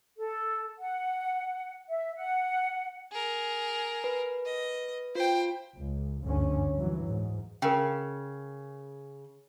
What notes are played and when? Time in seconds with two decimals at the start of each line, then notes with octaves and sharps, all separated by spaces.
0.17 A4
0.78 F#5
1.88 E5
2.16 F#5
3.12 G#4 A#4
4.04 B4
4.45 D#5
5.15 F4 C5 G5
5.76 C#2
6.22 F#1 D2 G2 D3 C#4
6.76 G2 E3 F#3
7.08 G#2
7.62 C#3 A#4 G5